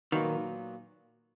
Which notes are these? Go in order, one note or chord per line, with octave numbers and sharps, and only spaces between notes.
A#2 D#3 F#3 B3 F#4 B4